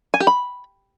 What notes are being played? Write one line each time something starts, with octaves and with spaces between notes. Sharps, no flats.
G#5
G4
B5